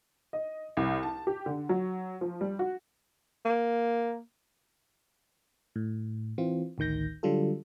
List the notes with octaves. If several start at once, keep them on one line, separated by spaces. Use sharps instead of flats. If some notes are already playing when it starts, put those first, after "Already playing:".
D#5
C2
A5
G4
D3
F#3
F3
G3
F#4
A#3
A2
E3 C4 F4
A1 D2 D#3 G6 A#6
D3 F#3 G3 F4 A4